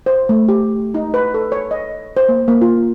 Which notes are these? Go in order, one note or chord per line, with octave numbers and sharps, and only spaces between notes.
C5
A3
G4
D#4
B4
A4
C#5
D#5
C5
A#3
A#3
F4